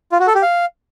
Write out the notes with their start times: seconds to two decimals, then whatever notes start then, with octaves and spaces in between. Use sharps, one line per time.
0.12 F4
0.20 F#4
0.27 A4
0.35 G4
0.43 F5